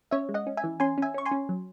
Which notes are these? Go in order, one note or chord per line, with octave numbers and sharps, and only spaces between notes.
C#4 C#5 E5
G#3
D#5 F#5
C#4
E5 G#5
E3
C#4 G#5 C6
C#4 E5 G#5
C#4 C#6
G#5 C6
C#4
F#3